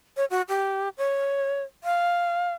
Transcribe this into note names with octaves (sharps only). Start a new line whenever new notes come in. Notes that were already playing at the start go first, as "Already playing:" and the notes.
C#5
F#4
G4
C#5
F5